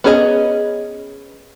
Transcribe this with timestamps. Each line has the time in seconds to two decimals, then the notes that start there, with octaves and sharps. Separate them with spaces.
0.04 B3 C#4 G#4 A4 D#5